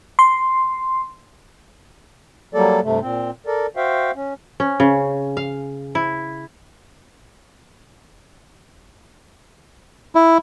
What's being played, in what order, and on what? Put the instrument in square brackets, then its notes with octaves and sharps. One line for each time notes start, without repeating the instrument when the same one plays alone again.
[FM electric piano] C6
[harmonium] F#3 G3 A#3 A4 D5
G2 C3 A3
A#2 C4
A4 A#4 D5
F#4 C5 E5 F5 G5
C#4
[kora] C#4
C#3
F5
E4
[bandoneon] E4